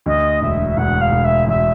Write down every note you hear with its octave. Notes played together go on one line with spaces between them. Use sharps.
D2 D#5
E1 E5
E1 F#5
F5
E1
E5
E1 E5